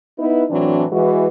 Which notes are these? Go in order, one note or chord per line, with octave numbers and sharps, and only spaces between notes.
B3 D#4 E4 B4
A2 E3 F#3 C4 D4
E3 G#3 F#4